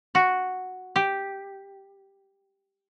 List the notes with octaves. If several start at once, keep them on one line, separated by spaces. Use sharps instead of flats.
F#4
G4